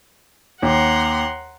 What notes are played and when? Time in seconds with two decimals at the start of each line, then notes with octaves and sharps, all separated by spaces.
0.62 D#2 F#5 A#5 C6